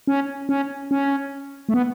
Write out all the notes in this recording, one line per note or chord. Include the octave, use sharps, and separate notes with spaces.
C#4
C#4
C#4
A3
B3